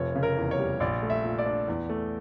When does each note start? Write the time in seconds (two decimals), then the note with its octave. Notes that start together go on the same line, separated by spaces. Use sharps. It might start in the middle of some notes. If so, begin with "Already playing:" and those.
Already playing: F1 F3 C#5
0.15 C#3
0.23 A#4
0.37 E2
0.51 C#5
0.59 G3
0.80 A#1 D5
1.03 A3
1.10 E5
1.24 A#2
1.38 D5
1.46 D4
1.68 E2
1.89 A3